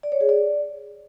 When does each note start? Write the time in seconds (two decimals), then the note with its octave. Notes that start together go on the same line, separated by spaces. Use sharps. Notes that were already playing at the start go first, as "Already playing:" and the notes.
0.03 D5
0.12 C#5
0.21 G#4
0.29 D5